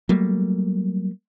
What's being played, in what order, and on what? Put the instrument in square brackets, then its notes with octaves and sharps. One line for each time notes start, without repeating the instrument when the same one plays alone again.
[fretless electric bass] F#3 G3 A3 A#3